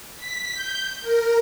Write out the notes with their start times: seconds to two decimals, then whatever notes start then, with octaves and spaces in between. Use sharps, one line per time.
0.17 B6
0.53 G6
1.01 A#4